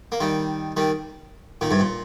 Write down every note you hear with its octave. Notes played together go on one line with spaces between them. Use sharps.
A#3
D#3 G3
D#3 G3
A#2 D#3
G2 C3
A#2